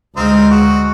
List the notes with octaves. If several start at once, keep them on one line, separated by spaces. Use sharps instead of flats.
D2 G#3 C4 D#4 F4
F#4